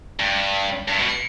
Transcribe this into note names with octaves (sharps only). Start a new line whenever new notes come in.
G2
G2
B2